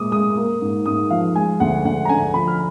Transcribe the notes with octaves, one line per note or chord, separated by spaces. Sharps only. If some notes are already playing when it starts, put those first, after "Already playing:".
Already playing: A#2 G#3 D6 D#6
G#3 D#6
A#3
G#2
G#2 D#6
F3 F5
G#3 G#5
D2 F#5
D2 F#5
A#5
D3 G#5
F3 B5
F6